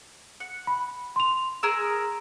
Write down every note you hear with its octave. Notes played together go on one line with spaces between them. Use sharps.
F#5
B5
C6 F7
G#4 A#4 E6